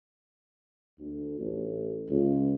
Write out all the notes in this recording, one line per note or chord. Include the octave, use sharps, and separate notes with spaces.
D2
A1
C#2